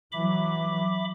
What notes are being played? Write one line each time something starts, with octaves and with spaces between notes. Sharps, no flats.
E3 F#3 E5 B5 D6